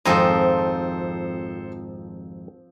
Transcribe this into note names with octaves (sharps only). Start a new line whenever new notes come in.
G#1 F2 F3 C4 D#4 A4 C5 G#5